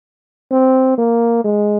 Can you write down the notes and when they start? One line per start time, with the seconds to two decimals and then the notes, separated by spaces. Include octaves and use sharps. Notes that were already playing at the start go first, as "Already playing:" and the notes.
0.51 C4
0.98 A#3
1.44 G#3